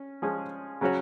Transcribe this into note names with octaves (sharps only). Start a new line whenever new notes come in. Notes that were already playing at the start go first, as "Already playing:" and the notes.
Already playing: C#4
F3 G#3 C#4 G#4
C#3 F#3 C#4 F#4 C#5